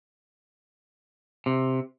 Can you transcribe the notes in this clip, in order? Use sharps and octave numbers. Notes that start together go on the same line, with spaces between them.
C3